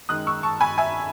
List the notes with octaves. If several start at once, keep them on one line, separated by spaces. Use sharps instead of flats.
F#2 D#3 G#3 D#6 F#6
C#6 E6
A5 C#6
G#5 B5
E5 G#5